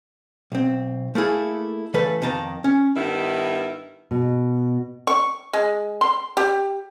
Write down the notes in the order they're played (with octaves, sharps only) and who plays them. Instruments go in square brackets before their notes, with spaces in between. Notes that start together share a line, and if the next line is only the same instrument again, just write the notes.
[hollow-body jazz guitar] B1 C4
A3 A#3 E4 G#4 A4
C#3 E3 A3 A4 B4
F2 D#3 A5 A#5
C#4
[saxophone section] G2 D#3 B3 E4
[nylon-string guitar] B2
[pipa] C#6
G#3
C6
G4